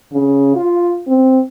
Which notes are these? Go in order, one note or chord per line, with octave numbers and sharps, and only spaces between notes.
C#3
F4
C4